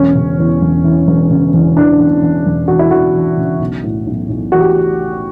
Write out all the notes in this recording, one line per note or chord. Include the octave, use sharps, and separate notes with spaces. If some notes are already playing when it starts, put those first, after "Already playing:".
Already playing: E1 C#4
C#3
E2
E1
E3
E1
C#3
E2
E3 D4
E2
E2
E1
E3 F#4
E4
E3 F#4
E3
C#3
B1
A2
B1
B1
E3 F#4
G4